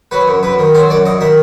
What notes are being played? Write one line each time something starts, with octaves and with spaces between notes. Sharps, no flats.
F#3 B4
F#2
F#2 B4
D#3
F#3 C5
F#2 D5
F#2 D#5
D#3 E5